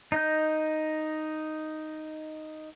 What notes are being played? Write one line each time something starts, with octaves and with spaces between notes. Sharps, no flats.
D#4 D#5 G6